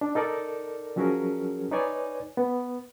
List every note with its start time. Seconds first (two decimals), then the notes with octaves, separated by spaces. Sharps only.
0.01 D4
0.15 D#4 A4 A#4 D5
0.96 F3 F#3 C#4 F#4 G#4 A#4
1.71 D#4 B4 C#5 D5 G#5
2.37 B3